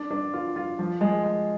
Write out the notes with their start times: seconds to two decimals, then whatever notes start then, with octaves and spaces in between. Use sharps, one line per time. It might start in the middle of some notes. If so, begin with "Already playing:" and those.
Already playing: D4
0.11 D4
0.34 F4
0.56 F4
0.79 F3
1.01 G#3
1.23 G#3